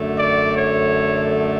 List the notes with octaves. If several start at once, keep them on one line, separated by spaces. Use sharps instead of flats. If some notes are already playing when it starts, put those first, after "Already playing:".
Already playing: F#2 D3 A3
D5
C#5